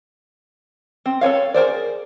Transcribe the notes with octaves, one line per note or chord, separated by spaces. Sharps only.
C4
A4 B4 C#5 F5
G#4 A#4 C5 D5